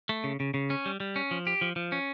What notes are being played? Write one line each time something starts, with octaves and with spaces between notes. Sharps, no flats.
A3
C#3
C#3
C#3
C#4
G3
G3
C#4
F3
G4
F3
F3
C#4